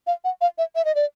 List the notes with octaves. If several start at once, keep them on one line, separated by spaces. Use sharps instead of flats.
F5
F#5
F5
E5
E5
D#5
D5